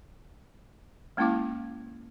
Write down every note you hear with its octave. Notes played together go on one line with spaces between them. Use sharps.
G#3 A#3 C#4 E4 F5 D6